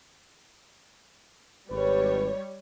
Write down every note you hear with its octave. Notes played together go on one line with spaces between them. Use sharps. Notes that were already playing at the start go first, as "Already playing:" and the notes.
G#1 G3 B4 C#5